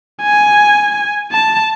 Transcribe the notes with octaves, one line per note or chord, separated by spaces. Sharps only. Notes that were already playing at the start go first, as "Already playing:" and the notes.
G#5
A5